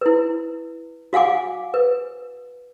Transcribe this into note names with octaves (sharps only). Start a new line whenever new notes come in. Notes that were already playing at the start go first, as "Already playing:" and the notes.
E4 B4
F#4 F5 F#5 G#5 D6
B4